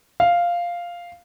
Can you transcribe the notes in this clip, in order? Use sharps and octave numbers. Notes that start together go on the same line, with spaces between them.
F5